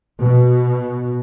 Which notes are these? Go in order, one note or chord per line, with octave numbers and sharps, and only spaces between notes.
B2